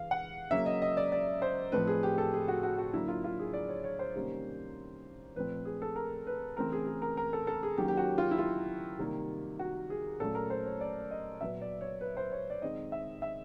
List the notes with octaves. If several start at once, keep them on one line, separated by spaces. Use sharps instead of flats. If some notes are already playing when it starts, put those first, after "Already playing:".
Already playing: E3 G#3 F5
F#5
C#3 F#3 A#3 C#4 E5
D#5
D#5
D5
D5
C5
A2 F3 A3 C4 B4
G#4
G4
A4
G#4
F#4
F#4
F#4
D3 F#3 A#3 E4
F4
F4
G#4
D5
C#5
C#5
C5
C3 D#3 G3 A#3 C#4
A#2 F3 A3 C4 B4
G#4
A4
A#4
B4
C#3 E3 A3 C4 A#4
G#4
G#4
A#4
A#4
A4
A4
G#4
D#3 F#3 A#3 C#4 G4
G4
F#4
F4
E4
F4
C3 D#3 G3 A#3
F#4
G#4
A#2 F#3 A3 C#4 A4
A#4
C5
C#5
D5
D#5
A#2 F#3 B3 E5
D5
C#5
B4
C5
C#5
D5
D#3 G#3 C4 D#5
E5
E5